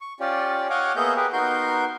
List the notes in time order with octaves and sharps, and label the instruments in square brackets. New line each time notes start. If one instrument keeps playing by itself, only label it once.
[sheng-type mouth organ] C#6
C#4 F4 G4 D5
C#5 D#5 F5 F#5 G#5 D6
A#3 B3 G#4 D#5 E5 G6
G4 G#4 A#4 B4
B3 D#4 F#4 A#4 C6 G6